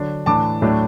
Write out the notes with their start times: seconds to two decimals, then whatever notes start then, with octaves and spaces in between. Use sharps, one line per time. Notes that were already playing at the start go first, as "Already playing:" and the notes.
Already playing: D3 F#3 D4
0.26 A2 E3 D4 A5 D6
0.62 A2 F#3 A3 D4